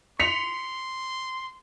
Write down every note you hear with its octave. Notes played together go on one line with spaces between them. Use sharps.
C6 B6 C#7 F7